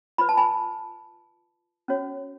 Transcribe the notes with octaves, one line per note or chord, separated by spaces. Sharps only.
F4 B4 B5
A5
G#5 B5
C#4 F#4 C#5